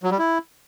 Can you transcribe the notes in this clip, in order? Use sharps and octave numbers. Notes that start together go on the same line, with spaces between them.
F#3
G3
E4